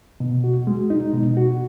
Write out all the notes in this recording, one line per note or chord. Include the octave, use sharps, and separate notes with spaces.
B2
F#4
G#3
D#4
B2
F#4